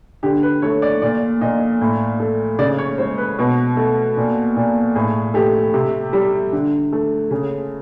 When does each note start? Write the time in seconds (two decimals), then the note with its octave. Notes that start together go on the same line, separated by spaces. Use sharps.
0.23 D3 G4
0.43 B4
0.62 A3 C#5
0.82 D5
1.02 A#2 D5
1.41 A#2 D#5
1.81 A2
2.20 A3
2.59 C#3 D5
2.78 C#5
2.98 G#3 C5
3.18 B4
3.39 B2
3.77 A3
4.17 A#2
4.56 A#2
4.95 A2 G#4
5.34 A3 G4
5.74 C3
6.13 G3
6.52 D3
6.93 A3
7.31 C#3 G#4